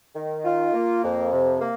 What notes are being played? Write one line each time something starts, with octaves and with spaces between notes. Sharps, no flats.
D#3
F4
A#3
F2
C3
A#3